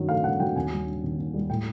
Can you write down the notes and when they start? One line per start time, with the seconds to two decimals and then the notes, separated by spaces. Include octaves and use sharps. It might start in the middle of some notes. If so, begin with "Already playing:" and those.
Already playing: G2 D#3 F#3
0.09 A3 F5
0.24 G2 F#5
0.40 F#3 G5
0.56 D#2 G#5
0.71 G3
0.87 D3
1.03 D#2
1.18 D#2
1.34 G3
1.49 A2 G5